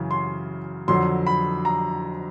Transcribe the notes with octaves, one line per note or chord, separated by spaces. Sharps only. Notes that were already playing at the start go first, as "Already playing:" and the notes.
Already playing: F#2 C#3 E3
C6
F2 D3 F#3 C6
B5
A#5